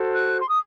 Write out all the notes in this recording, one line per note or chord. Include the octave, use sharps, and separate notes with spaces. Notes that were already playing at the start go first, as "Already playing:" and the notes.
Already playing: F#4 A4 C5
F#6
C6
D#6